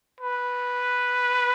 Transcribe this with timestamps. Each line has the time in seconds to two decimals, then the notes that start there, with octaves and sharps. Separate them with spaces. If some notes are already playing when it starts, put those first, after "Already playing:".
0.20 B4